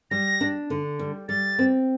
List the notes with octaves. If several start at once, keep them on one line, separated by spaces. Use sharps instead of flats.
G3 A#6
D4
D3
G3
G3 A6
C4